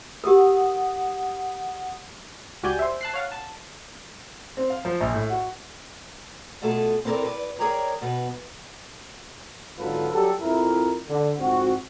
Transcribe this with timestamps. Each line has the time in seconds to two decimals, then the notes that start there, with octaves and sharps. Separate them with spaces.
0.24 G4 A#4 F#5 D#6
2.63 C#2 F#4 G4 D5 G#5 G6
2.79 C5 E5
3.01 A5 F#6 C7
3.14 C#5 F5 F#5
3.32 A5
4.57 C4
4.70 F5
4.85 F3
5.00 A#1
5.13 A2
5.30 F#4
6.62 B2 A3 F4 G#4 A4 A5
7.05 C4 E4 A4 A#4 D5
7.25 B4 D5
7.59 G#4 A#4 C#5 D5 G5 A#5
8.01 B2 B4
9.79 G#1 D3 F#3 F4 A4 B4
10.11 F#3 G3 G4 A4
10.40 F2 E4 A#4
11.08 D3
11.39 G#1 F2 C4 F#4